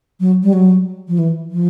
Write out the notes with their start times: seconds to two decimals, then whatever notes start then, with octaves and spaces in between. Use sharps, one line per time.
0.20 F#3
0.43 G3
0.53 F#3
1.08 F3
1.19 E3
1.51 F3